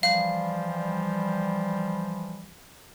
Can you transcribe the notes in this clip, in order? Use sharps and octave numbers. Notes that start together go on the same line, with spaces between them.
E3 F3 G3 F5